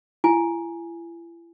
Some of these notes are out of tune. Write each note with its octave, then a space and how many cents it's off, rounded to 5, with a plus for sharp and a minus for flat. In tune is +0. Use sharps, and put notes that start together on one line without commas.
E4 +40 G#5 +0